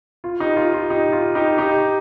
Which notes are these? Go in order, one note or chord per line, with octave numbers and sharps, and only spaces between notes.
F4
D#4 G4
F4
F4
D#4 G4
F4
D#4 G4
D#4 G4